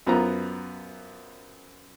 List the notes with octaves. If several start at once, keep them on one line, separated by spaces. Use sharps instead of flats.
F#2 B3 F4 C5 A#5